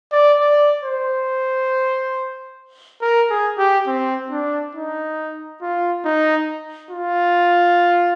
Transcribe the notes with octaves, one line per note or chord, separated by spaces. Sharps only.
D5
D5
C5
A#4
G#4
G4
C4
D4
D#4
F4
D#4
F4